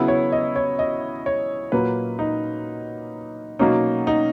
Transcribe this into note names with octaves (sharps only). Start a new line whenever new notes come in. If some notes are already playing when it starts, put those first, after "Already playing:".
Already playing: C#3 F#3 B3 E4
C#5
D#5
C#5
D#5
C#5
A#2 F#3 A#3 B4
D#4
B2 F#3 A#3 C#4 D#4
D#4